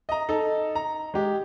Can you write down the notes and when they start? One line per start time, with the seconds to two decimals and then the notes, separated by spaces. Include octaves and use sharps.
0.09 D#5 A#5
0.29 D#4 A4
0.75 A#5
1.14 G#3 G4